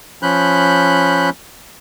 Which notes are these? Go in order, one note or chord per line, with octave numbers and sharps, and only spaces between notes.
F3 C#4 B5 F#6 G6